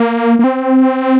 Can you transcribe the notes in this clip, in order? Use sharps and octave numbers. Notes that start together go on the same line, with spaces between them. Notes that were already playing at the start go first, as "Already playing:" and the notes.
Already playing: A#3
A#3
C4